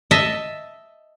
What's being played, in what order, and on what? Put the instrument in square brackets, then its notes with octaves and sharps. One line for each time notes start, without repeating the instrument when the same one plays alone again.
[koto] D#5 E5 A5